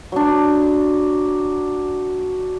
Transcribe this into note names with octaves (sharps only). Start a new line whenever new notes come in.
F#3 D4